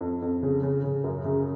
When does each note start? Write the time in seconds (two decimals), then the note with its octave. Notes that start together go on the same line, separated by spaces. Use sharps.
0.01 F2
0.22 F2
0.43 C#3
0.63 C#3
0.84 C#3
1.04 F#2
1.25 C#3